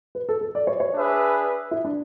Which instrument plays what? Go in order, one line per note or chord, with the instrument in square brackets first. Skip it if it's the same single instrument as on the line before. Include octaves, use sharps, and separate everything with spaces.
[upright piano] B4
A4
A4
D5
C#5
C#5
[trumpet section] D4 G#4 B4 E5
[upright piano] E4
D4